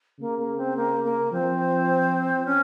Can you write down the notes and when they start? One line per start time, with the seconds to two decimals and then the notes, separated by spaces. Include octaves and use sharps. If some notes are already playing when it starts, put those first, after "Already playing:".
0.20 C#3 A#3
0.39 A#3
0.57 C4
0.77 A#3
1.04 A#3
1.32 F3 C4
2.46 C#4